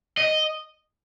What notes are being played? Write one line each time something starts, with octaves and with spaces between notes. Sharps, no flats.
D#5